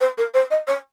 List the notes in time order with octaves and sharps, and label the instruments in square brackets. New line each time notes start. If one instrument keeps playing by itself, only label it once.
[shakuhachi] C5
A#4
C5
D#5
C#5